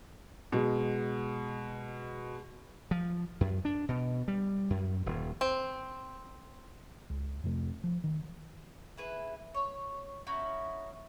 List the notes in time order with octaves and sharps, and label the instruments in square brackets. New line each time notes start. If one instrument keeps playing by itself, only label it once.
[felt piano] B2 G#3
[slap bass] F3
F#2
D4
B2
G3
F#2
D#1
[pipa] C4
[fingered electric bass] C#2
F2 C3 A3
F3
D#3
[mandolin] E4 G#4 B4
C#5
C#4 D#4 E4 F#4